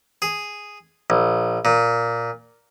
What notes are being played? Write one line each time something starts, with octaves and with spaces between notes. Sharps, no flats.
G#4
A#1
A#2